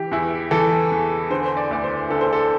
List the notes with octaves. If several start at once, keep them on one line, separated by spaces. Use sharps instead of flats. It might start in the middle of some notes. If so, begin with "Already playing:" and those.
Already playing: E3 G4
E2 E4
E3 A4
E2
D3 C5
C5
D5
D2 D5
C5
D3 A4
C5
A4